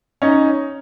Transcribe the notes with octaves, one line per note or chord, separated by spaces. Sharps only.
C#4 D#4